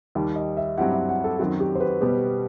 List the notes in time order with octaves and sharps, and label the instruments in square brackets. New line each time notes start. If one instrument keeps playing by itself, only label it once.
[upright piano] D#2 D#3 G3
[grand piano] D#5
E5
[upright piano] G2 F#3 C4 E4 G4 [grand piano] F#5
[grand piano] E5
F#5
A4
[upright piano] F#2 D#3 F#3 C4 [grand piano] F#4
[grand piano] G4
C5
B4
[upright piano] B2 G3 B3 [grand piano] G4